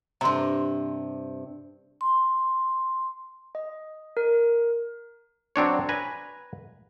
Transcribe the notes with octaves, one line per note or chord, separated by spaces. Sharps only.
G2 C3 A#5 C6
C6
D#5
A#4
F#3 C4 D4 C#5
B4 G#5 A#5